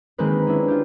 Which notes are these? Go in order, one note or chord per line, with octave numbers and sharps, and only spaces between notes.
D#3 G#3 A#3 C4 A#4 B4
C#4 D4 E4
F4 G4